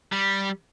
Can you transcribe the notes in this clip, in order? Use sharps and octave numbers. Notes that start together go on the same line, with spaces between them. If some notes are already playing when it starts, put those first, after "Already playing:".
G3